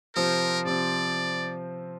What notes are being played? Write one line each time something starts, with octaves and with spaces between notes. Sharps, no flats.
C3 F3 C4 A#4
C3 F3 C4 D5